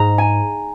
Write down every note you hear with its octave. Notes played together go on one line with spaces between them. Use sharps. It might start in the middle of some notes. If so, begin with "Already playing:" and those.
Already playing: G#2 A#5
G#5